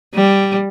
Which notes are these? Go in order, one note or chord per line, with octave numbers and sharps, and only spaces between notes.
G3